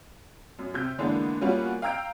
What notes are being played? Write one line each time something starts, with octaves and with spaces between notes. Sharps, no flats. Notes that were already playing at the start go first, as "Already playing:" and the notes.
F#2
C3 F6 G6
D3 E3 G#3 A#3 B3 D4
G3 A#3 B3 C#4 F4 F#4
F5 G5 A#5 E6 G6 D7